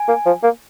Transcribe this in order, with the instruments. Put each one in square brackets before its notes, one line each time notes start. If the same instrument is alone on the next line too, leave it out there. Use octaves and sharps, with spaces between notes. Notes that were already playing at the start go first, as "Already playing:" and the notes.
Already playing: [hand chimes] G#5
[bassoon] A#3
F3
A#3